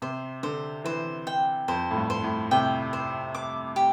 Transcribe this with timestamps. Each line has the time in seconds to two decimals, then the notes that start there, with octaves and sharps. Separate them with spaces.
0.02 C3 C5
0.43 D3 C5
0.84 E3 C5
1.27 G5
1.68 F2 C5
1.91 A2
1.96 G2
2.10 C5
2.24 A2
2.51 C3 G5
2.93 C5
3.35 D6
3.76 G4